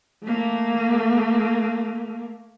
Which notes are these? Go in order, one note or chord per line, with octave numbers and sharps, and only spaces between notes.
A3 A#3